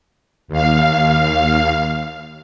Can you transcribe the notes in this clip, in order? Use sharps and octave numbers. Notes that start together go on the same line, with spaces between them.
D#2 F5